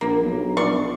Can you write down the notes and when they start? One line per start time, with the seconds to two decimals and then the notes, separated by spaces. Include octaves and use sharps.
0.01 A#1 A#3
0.22 B1
0.57 A#1 D5 C6 C#6